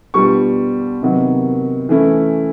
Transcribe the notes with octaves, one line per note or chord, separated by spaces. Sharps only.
B2 G3 B3 D4 F4 C#6
C3 D#3 F#3 B3
E3 A3 C#4 E4